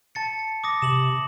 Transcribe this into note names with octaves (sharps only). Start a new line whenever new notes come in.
A5 A6 C#7
D6 D#6 A#6
C3 E7 F#7